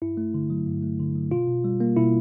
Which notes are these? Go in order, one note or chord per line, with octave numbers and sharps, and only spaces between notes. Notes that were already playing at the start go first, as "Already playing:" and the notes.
G2 E4
A3
D3
F#3
G2
A3
D3
F#3
B2 F4
B2
G3
A#3
B2 E4